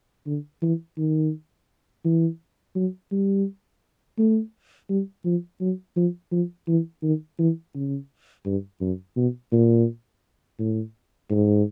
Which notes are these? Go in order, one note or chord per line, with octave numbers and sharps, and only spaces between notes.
D3
E3
D#3
E3
F#3
G3
A3
G3
F3
F#3
F3
F3
E3
D#3
E3
C#3
G2
F#2
B2
A#2
A2
G#2